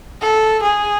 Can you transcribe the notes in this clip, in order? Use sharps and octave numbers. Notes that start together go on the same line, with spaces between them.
A4
G#4